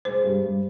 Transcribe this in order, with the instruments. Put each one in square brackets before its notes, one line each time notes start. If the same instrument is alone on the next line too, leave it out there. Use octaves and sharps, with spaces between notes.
[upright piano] G#3 [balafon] C5
[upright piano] G2
G2